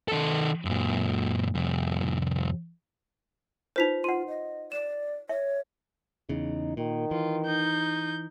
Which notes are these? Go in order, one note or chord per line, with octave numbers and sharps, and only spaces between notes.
D#3 A4
F#2 A#2
C2 F2
D#4 F4 B4 C5 B6 F7
F4 F#5 C6 D#7
D#5
D5 E7
C#5 E5
E2 C#3 D#4
A#2 D#3
E3 F4
D#4 G6